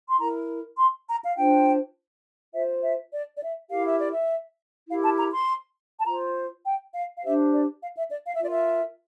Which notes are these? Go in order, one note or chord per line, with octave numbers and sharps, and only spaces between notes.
C6
E4 A#4 A#5
C6
A#5
F5
D4 F4 C5 G5
F4 C5 E5
E5
D5
D5
E5
E4 G4 A#4 F5
E5
D5
E5
E4 G4 A#4 F5
A5
A#5
C6
A5
F4 C5 A#5
G5
F5
F5
D4 G4 C5 E5
D5
F5
E5
D5
F5
E5
F4 A#4 D5
E5